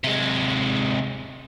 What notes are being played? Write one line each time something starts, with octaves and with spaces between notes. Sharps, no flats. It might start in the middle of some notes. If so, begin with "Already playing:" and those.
C3 G#3